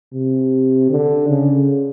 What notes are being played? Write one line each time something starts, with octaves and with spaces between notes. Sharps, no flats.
C3
D3
C#3